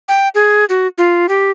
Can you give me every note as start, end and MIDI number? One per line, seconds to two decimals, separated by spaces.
0.08 0.28 79
0.35 0.65 68
0.69 0.87 66
0.98 1.27 65
1.29 1.51 67